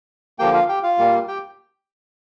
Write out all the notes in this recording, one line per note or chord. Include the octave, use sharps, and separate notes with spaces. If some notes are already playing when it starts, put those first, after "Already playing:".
D3 F3 A#3 G4 G5
F4 F5
G4 G5
F4 F5
A#2 G3 A#3
G4 G5